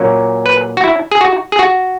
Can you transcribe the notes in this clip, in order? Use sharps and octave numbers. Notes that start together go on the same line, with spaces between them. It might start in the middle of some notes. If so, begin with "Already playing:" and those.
Already playing: A#2 F#3 A#3 C#4
B4
F#4
E4
G#4
F#4
G#4
F#4